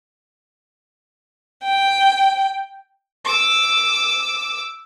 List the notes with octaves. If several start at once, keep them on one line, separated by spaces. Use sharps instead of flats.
G5
D6 E6